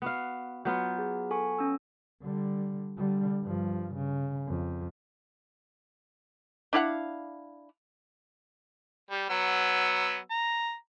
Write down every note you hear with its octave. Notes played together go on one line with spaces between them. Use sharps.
B3 F#4 F5
F#3 B3 F4 G6
G#4
A4 G#5 C#6
C#4 E6
D3 G3
D3 G3
G2 F3
C#3
F2
D4 E4 F5 F#5
G3
F#3 B3 E6
A#5